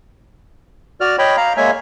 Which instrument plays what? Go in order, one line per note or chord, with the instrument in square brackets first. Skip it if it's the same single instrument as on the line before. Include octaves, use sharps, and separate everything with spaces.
[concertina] F#4 D5 F6
C#5 D#5 G5 B5
F5 A#5
G#3 A#3 C#5 E5 G#5